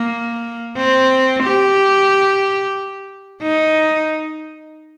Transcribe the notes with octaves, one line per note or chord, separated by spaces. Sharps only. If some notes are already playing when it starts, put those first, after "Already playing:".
Already playing: A#3
C4
G4
D#4